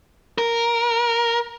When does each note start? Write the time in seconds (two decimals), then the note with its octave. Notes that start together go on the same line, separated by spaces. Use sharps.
0.38 A#4